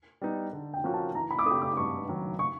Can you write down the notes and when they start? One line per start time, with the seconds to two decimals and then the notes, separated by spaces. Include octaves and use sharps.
0.21 G3 B3 D#4
0.53 D3
0.74 G5
0.84 F3 A#3 C#4 F#4
0.94 A5
1.14 E3 A#5
1.31 B5
1.39 D6
1.46 A3 D4 G4 D#6
1.61 D6
1.77 G2 C#6
2.08 D#3 F#3
2.39 C#6